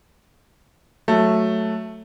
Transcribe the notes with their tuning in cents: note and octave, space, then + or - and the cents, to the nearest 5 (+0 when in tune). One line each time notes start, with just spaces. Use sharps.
F#3 +0 A3 +0